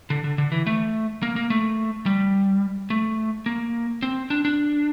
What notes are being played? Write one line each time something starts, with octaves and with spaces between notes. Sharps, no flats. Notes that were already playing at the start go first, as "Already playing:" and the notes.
D3
D3
D3
E3
A3
A#3
A#3
A3
G3
A3
A#3
C4
D4
D4